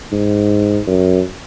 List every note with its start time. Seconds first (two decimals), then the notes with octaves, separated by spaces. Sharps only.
0.12 G#2
0.87 F#2